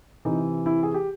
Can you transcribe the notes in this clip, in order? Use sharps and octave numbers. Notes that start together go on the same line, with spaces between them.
C3 E3 D#4
E4
G#4
G4